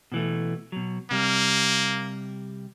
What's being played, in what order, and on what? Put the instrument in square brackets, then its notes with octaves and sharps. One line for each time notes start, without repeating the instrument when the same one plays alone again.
[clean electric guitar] B2 E3 A3
B2 F#3
[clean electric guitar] C3 G3 [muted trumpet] A#3